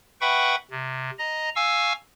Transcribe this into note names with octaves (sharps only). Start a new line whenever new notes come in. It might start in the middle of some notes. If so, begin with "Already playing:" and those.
B4 E5 F#5 G5 B5 C#6
C3
D#5 A#5
F5 G#5 C#6 E6